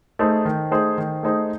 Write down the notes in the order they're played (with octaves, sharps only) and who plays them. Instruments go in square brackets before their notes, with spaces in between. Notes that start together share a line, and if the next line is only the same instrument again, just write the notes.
[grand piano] A3 D#4 G#4 C5
D#3
A3 D#4 G#4 C5
D#3
A3 D#4 G#4 C5